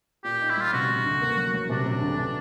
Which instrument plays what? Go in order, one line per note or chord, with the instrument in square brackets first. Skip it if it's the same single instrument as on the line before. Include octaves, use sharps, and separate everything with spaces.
[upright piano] A#2 [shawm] G4
[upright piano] D#4
[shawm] E4
[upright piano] G3 [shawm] F4
[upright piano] C3 [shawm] F#4
[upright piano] C3
D2
A#3
F#3
F#3
[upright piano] C3 [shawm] D4
[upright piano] C3
D2
B2